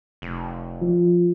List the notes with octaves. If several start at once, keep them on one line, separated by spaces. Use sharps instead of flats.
F1
F3